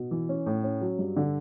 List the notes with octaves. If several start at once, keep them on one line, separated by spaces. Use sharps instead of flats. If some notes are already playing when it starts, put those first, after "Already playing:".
Already playing: B2
E3
C#4
A2
C#4
F#3
G2
D3